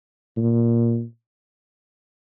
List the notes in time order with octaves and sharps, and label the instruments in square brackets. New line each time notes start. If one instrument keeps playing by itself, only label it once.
[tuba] A#2